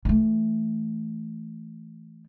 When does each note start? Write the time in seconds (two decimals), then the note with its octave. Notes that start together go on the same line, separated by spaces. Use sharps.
0.05 E3 A3